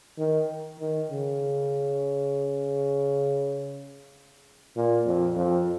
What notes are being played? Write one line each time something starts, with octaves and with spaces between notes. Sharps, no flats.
D#3
D#3
C#3
A#2
F2
F2